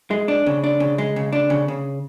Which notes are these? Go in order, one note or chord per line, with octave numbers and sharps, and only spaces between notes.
G#3
D4
C#3
D4
C#3
G#3
C#3
D4
C#3
C#3